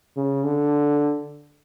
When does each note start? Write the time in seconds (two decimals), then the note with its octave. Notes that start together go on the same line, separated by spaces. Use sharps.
0.16 C#3
0.44 D3